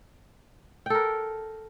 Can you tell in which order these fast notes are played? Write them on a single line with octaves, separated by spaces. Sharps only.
G5 A4 A#4